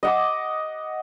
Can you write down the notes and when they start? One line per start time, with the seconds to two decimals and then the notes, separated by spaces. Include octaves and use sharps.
0.03 D#5 F#5 D6